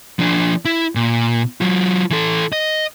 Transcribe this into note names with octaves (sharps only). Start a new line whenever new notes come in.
F3 D4
E4
A#2
F#3 F4
E3 A4
D#5